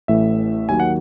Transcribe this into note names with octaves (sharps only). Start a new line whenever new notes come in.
A1 A2 E3 A3 E5
D#2 D#3 F#3 G#5
F#5